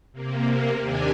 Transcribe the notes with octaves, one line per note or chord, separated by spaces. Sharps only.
C3 A#3
D#2 C3 D4 G4 G#5